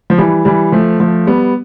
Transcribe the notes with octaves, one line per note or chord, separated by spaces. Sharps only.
F3
E3 G3
E3 G3
F3 A3
F3 A3
G3 B3